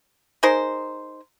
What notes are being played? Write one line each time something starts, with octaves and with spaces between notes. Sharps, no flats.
D#4 G#4 A#4 C5